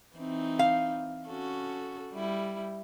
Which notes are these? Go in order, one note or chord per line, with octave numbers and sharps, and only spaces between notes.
E3 C4 D#4
F5
C#4 F#4 A4
G3 E4